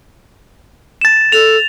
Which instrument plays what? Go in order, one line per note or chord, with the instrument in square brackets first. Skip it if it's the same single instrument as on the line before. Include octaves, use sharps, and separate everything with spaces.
[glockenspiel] A6 E7
[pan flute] A4 [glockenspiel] F7